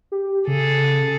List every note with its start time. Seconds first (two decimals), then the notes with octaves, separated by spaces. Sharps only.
0.12 G4
0.47 C#3 G#4 A4